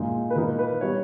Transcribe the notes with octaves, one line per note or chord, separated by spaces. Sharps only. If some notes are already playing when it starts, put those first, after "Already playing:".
Already playing: A#2 G#3 D#4
B4
A#2 A#3 D#4 A#4
B4
G3 B3 C#5